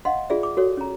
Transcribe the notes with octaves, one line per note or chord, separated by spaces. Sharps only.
D#5 F5 F#5 C6
F4 G#4 D5 E5
D6
F#4 A4 C#5
C#4 A#5